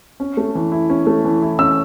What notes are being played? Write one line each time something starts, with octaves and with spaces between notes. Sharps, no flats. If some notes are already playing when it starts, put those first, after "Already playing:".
C#4
A3
E3
E4
C#4
A3
E3
E4
C#4 E6